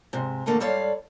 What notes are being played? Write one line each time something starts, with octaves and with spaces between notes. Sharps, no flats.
G#2 C3
A#2 D3 E3 A3 A#3
G#2 G3 A4 C#5 D5 F5